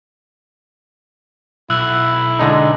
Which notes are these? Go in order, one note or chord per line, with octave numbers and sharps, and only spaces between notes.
B1 E4 E6 F#6
D3 G#3 D#4